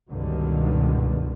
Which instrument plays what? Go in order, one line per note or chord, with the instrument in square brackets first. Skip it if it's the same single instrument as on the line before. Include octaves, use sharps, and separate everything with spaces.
[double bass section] C#2 G2 B2 D3 D#3